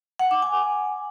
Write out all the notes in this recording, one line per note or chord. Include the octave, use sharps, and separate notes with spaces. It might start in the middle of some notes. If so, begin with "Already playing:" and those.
F#5
D6
G#5